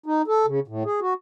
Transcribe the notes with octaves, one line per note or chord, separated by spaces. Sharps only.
D#4
A4
C#3
A2
G#4
F#4